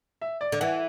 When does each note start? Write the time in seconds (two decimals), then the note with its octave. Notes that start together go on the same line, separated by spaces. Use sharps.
0.21 E5
0.41 D5
0.52 D3
0.60 E3 F#5